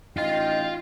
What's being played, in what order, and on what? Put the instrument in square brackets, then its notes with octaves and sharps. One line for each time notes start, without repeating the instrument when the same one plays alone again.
[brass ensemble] A1 D#4 G5 [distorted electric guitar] F4 F5 [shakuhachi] D#5